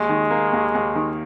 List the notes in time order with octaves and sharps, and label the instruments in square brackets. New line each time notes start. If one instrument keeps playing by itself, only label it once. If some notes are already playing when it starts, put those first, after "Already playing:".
Already playing: [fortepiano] D#2 [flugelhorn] G#3
[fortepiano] D#3
A#3
D#2
D#2
D#3